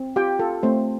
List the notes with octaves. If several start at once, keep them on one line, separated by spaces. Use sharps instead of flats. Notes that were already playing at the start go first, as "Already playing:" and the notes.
Already playing: C4
F4 G4 G5
F4 A4
A3 C4 C5